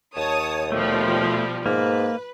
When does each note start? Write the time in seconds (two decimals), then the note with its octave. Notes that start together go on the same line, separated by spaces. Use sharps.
0.16 D#2 C#5 A5 D#6
0.72 B2 F3 G3 A3
1.66 G#2 A#3 B4